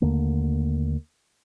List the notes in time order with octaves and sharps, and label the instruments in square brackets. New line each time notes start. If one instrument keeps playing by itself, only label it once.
[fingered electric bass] D#2 D3 A3 A#3